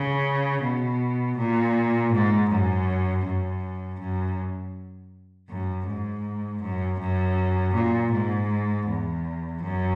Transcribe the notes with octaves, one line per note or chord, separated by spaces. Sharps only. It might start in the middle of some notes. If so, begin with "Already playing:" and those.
Already playing: C#3
B2
A#2
G#2
F#2
F#2
F#2
F#2
G#2
F#2
F#2
A#2
G#2
E2
F#2